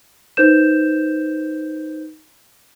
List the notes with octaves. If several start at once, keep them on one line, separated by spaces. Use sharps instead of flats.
D#4 B4 C5 G6 E7